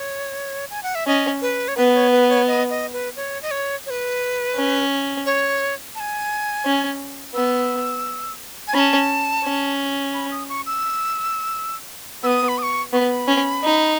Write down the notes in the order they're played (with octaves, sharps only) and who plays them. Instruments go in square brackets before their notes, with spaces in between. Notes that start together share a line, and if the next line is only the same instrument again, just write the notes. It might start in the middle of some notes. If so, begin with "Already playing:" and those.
Already playing: [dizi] C#5
G#5
F#5
E5
[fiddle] C#4 [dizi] D#5
[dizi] B4
C#5
[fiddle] B3 [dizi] B4
[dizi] C#5
B4
C#5
D#5
D#5
B4
C#5
D#5
C#5
C#5
B4
[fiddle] C#4
[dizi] C#5
A5
G#5
[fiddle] C#4
[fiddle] B3 [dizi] E6
[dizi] G#5
[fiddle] C#4 [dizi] B5
[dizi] A5
[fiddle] C#4
[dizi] B5
D#6
C#6
E6
[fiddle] B3 [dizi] E6
[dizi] D#6
B5
D#6
C#6
[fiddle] B3 [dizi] C#6
[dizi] B5
[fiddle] C#4
D#4